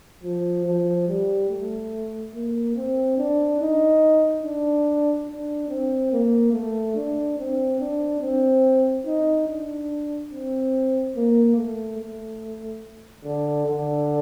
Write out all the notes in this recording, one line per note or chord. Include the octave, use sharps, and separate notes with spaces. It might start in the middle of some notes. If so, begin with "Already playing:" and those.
F3
F3
G3
A3
A#3
C4
D4
D#4
D4
D4
C4
A#3
A3
D4
C4
D4
C4
D#4
D4
C4
A#3
A3
A3
D3
D3